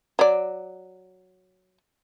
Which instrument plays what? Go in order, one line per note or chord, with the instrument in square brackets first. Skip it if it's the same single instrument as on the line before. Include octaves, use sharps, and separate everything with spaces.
[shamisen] F#3 D5